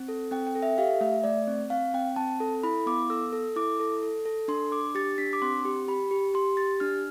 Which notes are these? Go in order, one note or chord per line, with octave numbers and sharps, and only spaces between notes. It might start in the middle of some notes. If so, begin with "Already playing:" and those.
Already playing: C4
A4
C4 G5
G5
A4
E5
G4 F5
A3 E5
A3 D5
C4
C4 F5
C4 G5
C4 A5
A4
E4 B5
B3 D6
A4 E6
A4
E4 D6
A4
A4
A4
D4 C6
D4 D6
G4 A6
D4 B6
D6
C4 C6
G4
G4 B5
G4
G4 C6
G4 A6
D4 F6